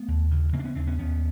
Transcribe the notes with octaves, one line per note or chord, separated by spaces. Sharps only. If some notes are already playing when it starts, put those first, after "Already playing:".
Already playing: A3 B3
D#2
C#3
C#3 A#3 C4
D4
B3 C#4
D#2 C4 D4
B3 C#4
D#2 B3 C#4